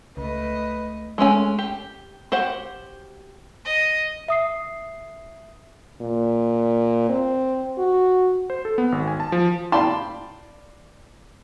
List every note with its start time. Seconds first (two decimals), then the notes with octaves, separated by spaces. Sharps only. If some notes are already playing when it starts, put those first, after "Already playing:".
0.17 C#2 A3 B4 D#5
1.18 G#3 A3 C#4 G#5
1.59 G4
2.32 F#4 G4 C5 F#5
3.65 D#5
4.28 E5 D#6 C7
6.01 A#2
7.09 C4
7.78 F#4
8.50 C5
8.65 A4
8.78 B3
8.92 G#1
9.08 G#5
9.20 A5
9.32 F3
9.72 D5 F5 G5 A5 B5 C6